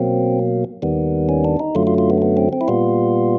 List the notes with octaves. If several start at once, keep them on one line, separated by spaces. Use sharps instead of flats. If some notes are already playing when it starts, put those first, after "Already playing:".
Already playing: B2 F#3 A#3 C4
D#2 D#3 G3 B3
C#4
D4
D#4
F#2 D3 F#3 A3 F4
F4
F4
B3
B3
C4
C4
E4
A#2 G3 B3 F4